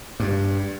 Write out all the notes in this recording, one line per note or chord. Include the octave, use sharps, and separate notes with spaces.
G2